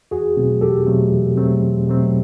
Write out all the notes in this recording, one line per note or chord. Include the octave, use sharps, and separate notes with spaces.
E2 F#4 G#4
B2 F#3 A3 C4
E2 G4 A4
B2 F#3 A3 C4
E2
B2 F#3 A3 C4
E2
B2 F#3 A3 C4